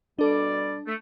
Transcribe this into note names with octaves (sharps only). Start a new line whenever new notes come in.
B2 G3 D4 A4 D5
A3